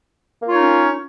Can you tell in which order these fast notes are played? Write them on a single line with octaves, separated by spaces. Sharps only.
A#3 F4 C#5 D#4 C#4